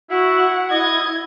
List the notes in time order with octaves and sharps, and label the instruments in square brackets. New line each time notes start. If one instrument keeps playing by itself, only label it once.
[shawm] E4 [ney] F#4 [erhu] F#5
[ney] E4 [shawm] D#5 [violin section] G#6